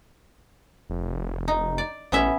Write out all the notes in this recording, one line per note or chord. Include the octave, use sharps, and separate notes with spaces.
F1
D#4
D5
A1 B3 C#4 E5